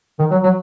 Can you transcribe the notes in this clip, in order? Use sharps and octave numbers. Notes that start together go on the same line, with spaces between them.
D#3
F#3
F#3